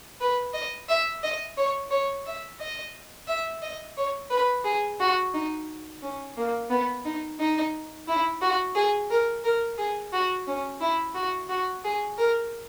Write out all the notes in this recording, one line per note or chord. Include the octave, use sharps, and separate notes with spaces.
B4
D#5
E5
D#5
C#5
C#5
E5
D#5
E5
D#5
C#5
B4
G#4
F#4
D#4
C#4
A#3
B3
D#4
D#4
E4
F#4
G#4
A#4
A#4
G#4
F#4
C#4
E4
F#4
F#4
G#4
A#4